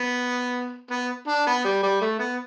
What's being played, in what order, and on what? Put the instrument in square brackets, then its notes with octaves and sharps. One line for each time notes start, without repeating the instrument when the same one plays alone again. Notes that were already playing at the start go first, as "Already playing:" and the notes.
Already playing: [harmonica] B3
B3
D4
B3
G3
G3
A3
B3